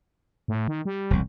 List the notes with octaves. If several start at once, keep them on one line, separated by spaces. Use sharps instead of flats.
A2
D#3
G3
E1 C2